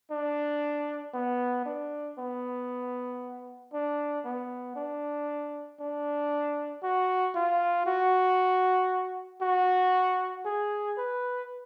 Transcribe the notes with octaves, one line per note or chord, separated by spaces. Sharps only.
D4
B3
D4
B3
D4
B3
D4
D4
F#4
F4
F#4
F#4
G#4
B4